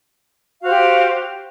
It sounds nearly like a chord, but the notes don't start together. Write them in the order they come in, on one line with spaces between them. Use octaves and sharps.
F5 F#4 C5 G4